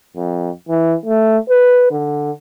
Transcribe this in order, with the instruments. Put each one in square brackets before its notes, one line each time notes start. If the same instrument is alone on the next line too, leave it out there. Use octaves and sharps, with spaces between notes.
[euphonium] F2
E3
A3
B4
D3